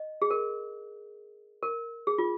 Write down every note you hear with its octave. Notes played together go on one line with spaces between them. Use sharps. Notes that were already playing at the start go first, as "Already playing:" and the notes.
Already playing: D#5
G#4
A#4
A#4
G#4
F4